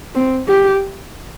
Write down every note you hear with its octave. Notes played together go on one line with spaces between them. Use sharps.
C4
G4